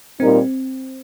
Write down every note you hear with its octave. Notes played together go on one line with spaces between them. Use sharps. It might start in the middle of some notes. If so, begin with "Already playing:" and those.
A#2 G3 C4 D#4 A#4